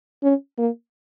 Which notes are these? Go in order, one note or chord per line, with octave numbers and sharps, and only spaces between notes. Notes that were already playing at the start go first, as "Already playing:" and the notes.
C#4
A#3